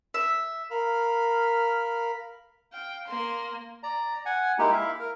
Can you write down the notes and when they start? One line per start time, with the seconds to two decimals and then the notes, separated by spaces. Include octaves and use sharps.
0.14 E5
0.71 A#4 F5 B5 F6
2.73 F5 G5
3.07 A#3 C6
3.83 D5 A#5
4.26 F#5 G#5
4.59 G#3 A#3 D#4 E4 G4
4.73 E4 E5 F5
5.00 A#4